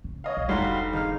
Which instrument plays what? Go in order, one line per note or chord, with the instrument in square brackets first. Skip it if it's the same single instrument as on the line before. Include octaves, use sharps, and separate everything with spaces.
[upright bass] C#3
[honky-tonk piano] C#5 D#5 F5
[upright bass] B1
[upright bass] F1 [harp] D2 D#4 A4 [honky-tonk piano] G3 [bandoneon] F#4 F5 C6
[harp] G#1 F6 [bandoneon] D#4 F5